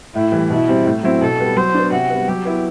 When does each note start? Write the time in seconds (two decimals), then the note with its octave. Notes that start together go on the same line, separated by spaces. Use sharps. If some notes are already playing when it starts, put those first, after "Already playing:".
0.15 A2 E4
0.32 E3 G3
0.50 B2 E4
0.68 G3 C4
0.86 A2
1.03 F#3 C4 E4
1.21 B2 A4
1.40 G3 B3
1.56 F#3 C5
1.74 B3 D4
1.92 C3 F#4
2.10 G3 B3
2.28 F#3 G4
2.45 B3 E4